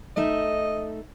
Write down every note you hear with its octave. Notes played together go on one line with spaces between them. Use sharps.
A3 D#4 D#5 E5